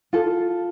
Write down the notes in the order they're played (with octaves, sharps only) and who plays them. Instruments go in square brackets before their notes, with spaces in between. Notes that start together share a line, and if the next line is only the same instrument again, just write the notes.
[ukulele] F4 A4